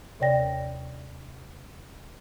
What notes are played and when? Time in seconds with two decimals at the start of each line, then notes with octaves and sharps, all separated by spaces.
0.20 D#2 C3 C#5 D5 G5 A#6